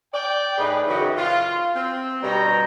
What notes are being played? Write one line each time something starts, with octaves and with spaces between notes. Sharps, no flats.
D5 G5
A2 D#4 G#4 B4
F#2 C#3 E3 D#4 F#4 G5
F4
C4
G2 B2 G3 G5 A#5